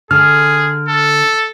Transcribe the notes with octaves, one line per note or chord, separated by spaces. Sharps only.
D3 G#4 F6
A4